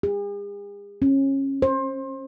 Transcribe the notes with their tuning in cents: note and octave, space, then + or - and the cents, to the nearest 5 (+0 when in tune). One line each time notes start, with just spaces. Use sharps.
G#4 -45
C#4 -25
C5 +25